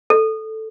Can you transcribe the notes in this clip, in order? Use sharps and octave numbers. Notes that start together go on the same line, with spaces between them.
A4